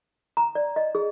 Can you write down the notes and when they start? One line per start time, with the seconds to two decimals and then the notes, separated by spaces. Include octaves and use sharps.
0.37 A#5
0.55 D5
0.76 D#5
0.95 G#4